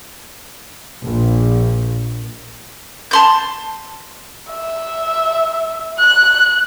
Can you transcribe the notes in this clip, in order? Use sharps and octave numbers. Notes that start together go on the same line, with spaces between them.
A#1
A5 C6 G6
E5
F#6